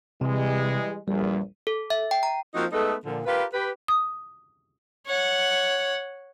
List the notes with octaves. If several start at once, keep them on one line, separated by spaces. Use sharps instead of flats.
C3 E3 G3 G#3
A#1 E2 G3
A4
E5
G5
A#5
F3 A#3 C4 D#4 F4 F#4
G#3 A3 B3 D#4 A4
A#2 D3 F3
F4 G4 A#4 B4
G4 B4
D#6
C#5 F#5